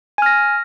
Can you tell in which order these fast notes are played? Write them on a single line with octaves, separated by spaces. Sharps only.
G#5 F6 A#6